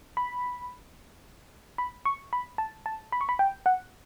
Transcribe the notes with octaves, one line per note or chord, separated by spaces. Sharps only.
B5
B5
C#6
B5
A5
A5
B5
C#6
B5
G5
F#5